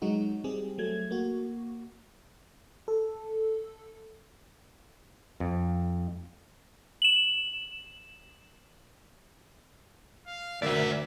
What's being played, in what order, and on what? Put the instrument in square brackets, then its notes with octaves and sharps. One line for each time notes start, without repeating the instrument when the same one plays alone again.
[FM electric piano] F#3 G#3 D#4 F#4
G3 C4 G4 G#4
F#3 A3 G#6
A#3 F#4
A4
[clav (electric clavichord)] F2
[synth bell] E7 F#7
[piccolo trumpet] F5
[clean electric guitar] D2 [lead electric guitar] F#4 D5 [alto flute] A#4 [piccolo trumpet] E5